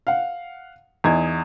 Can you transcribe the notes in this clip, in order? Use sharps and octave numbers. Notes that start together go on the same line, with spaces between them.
F5 F#5
E2 D#4 G#6